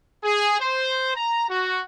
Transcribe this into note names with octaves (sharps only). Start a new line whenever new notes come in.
G#4
C5
A#5
F#4